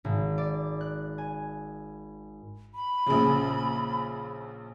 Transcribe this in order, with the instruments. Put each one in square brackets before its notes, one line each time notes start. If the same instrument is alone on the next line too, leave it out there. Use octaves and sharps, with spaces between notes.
[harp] G#1
D5
F#6
G#5
[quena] B5
[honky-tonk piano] A#1 C#3